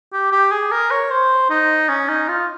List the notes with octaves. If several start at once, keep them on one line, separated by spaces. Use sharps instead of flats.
G4
G4
G#4
A#4
C#5
C5
D#4
C#4
D#4
F4